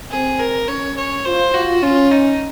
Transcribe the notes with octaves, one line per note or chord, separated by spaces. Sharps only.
C4 G#4
A#4
C#4 C#5
C#5
F4 C5
F4 F#4
C#4 F4
D#4